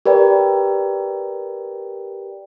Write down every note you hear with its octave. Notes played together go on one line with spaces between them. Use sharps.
G4 A#4 B4 D5 G5